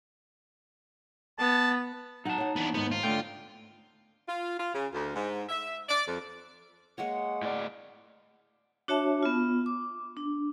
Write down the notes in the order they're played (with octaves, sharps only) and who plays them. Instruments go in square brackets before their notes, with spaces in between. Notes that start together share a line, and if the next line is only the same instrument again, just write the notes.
[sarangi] B3 [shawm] A5
[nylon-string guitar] F#3 F#5 [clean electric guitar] D#4 A5
[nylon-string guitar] C#5 F#5
[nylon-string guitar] E3 [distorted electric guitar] B3 D4
[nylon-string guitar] D#2 G#2 C5 [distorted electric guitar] B3
[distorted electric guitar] F4
[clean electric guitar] D3 G5 [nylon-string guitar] A3 C#4
[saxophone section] F4
F4
C#3
D2
G#2
E5
D5
F2
[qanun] G#3 A#3 C#5 [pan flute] F#5
[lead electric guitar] A2 D5
[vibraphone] D4 F#4 C#5 E5 A5
B3 F4
D6
D4